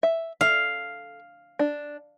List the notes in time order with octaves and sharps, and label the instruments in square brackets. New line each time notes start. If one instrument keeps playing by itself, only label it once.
[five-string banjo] E5
[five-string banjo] A4 E5 [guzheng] F5
[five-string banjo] D4